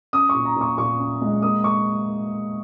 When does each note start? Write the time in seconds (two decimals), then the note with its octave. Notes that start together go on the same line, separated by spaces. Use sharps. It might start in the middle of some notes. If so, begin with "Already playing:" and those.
0.13 C#4 D#6
0.29 A#2 C#6
0.45 A#5
0.56 A#2 C#6
0.78 A#2 C#6
0.99 C#4
1.21 G#3
1.42 A#3 D#6
1.64 A#3 C#6